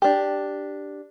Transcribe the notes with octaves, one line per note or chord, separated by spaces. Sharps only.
D4 G4